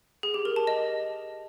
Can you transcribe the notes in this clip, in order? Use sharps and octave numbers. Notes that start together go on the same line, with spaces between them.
G#4
G4
A#4
A5
D#5